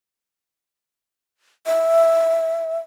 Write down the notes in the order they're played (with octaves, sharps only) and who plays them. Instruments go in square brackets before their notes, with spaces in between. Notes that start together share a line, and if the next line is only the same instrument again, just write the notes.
[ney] E5